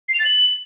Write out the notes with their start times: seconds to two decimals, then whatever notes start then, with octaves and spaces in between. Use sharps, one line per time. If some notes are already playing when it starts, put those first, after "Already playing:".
0.09 C7
0.14 F7
0.19 A6
0.25 F#7